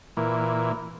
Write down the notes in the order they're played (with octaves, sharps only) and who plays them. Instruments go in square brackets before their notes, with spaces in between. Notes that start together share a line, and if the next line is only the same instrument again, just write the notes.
[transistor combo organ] A#2 E3